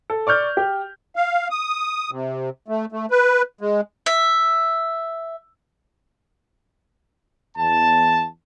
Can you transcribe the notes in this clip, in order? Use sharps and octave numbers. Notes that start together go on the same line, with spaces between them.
A4
D5 C#6 F6 G6
G4
F5
D#6
C3
A3
A3
B4
G#3
E5
E2 A5